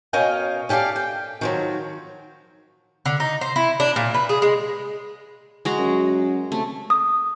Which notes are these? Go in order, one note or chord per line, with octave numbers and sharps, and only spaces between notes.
B2 C#4 A#4 D#5 F5 G5
C#4 G4 A4 D5 F5
G5
D#3 F3 F#3
D3
D#4
C5
E4
D4
A#2
B4
G#4
G#3
G#3 F#4 A#5
F#2
C3 A3
D#6